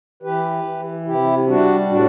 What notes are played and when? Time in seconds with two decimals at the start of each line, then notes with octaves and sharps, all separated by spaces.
0.23 E3 G4 B4
0.64 E3
1.06 C3 E4 G4
1.47 G3 D4 F#4
1.89 A2 D4 F#4